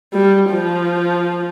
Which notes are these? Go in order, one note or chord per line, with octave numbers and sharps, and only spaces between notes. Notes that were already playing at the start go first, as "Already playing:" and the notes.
G3
F3